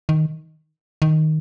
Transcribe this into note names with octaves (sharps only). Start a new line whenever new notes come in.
D#3
D#3